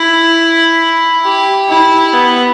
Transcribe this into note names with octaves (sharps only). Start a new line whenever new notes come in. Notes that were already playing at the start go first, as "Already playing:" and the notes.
Already playing: E4
G4
E4
B3